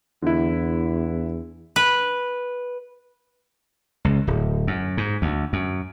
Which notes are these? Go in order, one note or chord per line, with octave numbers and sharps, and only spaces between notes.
E2 D3 E4
B4
C#2
D1
F#2
G#2
D2
F#2